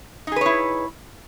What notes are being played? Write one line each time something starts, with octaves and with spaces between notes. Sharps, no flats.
D#4 E4 G#4 B4 C#5